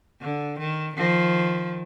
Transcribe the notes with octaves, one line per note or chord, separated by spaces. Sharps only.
D3
D#3
D#3 F3